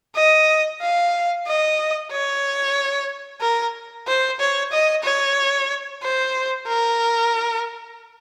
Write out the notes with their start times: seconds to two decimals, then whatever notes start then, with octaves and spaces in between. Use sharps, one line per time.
0.16 D#5
0.82 F5
1.47 D#5
2.11 C#5
3.41 A#4
4.07 C5
4.40 C#5
4.72 D#5
5.04 C#5
6.02 C5
6.68 A#4